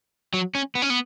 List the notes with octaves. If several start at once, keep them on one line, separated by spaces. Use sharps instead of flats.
F#3
C#4
B3
C#4
B3